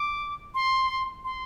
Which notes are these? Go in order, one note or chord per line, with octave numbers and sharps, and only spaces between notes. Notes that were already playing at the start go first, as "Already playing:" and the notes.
Already playing: D6
C6
C6